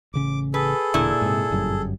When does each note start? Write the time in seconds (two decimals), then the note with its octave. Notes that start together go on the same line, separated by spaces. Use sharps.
0.14 A1 C#3 C#4 D6
0.54 G#4 A4 B4
0.94 E1 A#2 D3 E4
1.21 G#2 C3
1.50 G1 F#2 G3